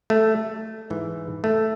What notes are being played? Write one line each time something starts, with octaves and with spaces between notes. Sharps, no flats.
A3
G#2 E3
A3